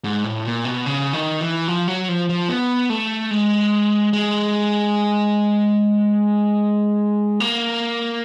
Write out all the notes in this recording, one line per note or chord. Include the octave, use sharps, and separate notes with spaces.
G#2
A2
A#2
B2
C#3
D#3
E3
F3
F#3
F3
F3
B3
A3
G#3
G#3
A#3